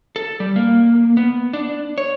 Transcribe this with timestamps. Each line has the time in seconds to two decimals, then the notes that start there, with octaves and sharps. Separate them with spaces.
0.16 A4
0.40 G3
0.56 A#3
1.17 B3
1.53 D4
1.98 C#5